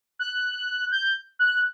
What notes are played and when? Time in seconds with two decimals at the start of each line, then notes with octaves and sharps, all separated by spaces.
0.19 F#6
0.92 G6
1.39 F#6